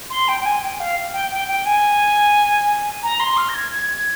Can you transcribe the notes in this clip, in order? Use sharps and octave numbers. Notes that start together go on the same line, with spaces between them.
C6
G5
G5
G#5
G5
F5
G5
G5
G5
G#5
A#5
C6
F6
A#6
G#6
G#6